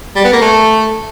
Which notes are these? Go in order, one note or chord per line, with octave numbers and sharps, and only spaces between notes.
G3
B3
A#3
A3